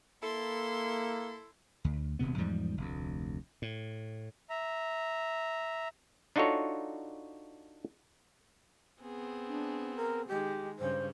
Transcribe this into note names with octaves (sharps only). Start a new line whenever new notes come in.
A#3 E4 A4 C6
D2
D#1 D2 C3 B3
E2 G#2 F3 G3
F1 D2
A2
E5 A#5
D4 D#4 F4 F#4 A4 C#5
B3 C4 G#4
D4
A#4
D#3 G#3 G4
G2 C#3 C#4 C5